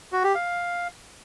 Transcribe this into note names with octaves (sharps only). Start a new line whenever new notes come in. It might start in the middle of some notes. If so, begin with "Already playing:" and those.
F#4
G4
F5